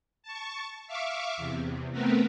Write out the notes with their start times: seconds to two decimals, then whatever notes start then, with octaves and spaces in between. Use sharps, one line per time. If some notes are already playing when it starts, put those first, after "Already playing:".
0.23 A5 C#6
0.87 E5 F5 C#6 D6
1.37 E2 C3
1.92 A3 B3 C4 A#4 B4